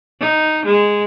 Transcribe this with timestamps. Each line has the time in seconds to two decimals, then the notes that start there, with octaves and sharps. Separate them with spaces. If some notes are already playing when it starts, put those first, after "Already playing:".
0.20 D#4
0.66 G#3